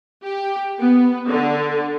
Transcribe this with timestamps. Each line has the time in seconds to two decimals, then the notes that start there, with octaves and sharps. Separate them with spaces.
0.24 G4
0.80 B3
1.28 D3